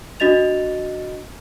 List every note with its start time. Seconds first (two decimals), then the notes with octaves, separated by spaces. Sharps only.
0.20 D4 F#4 D#5 A6 F7